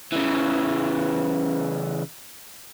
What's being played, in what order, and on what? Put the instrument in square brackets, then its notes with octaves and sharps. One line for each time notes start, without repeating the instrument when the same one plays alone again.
[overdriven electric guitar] C#3 E3